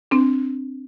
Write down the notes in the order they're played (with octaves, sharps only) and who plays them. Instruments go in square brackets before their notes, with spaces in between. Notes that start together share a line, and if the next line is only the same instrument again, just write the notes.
[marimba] C4 D4